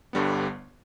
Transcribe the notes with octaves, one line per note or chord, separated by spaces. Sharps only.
G1 G2 D3 G3 B3